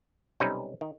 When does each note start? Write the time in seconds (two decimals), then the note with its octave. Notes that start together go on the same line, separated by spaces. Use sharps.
0.40 B1 C3 G3 C#4 D#4 B4
0.81 D#3